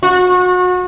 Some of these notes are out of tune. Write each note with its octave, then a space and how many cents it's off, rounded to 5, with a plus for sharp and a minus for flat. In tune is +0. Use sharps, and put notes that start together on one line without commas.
F#4 -30